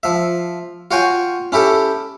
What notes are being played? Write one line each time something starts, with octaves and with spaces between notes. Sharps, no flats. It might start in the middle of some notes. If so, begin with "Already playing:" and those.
F3 E5
F4 F#4 C#5 G5 G#5
C#4 E4 G4 A4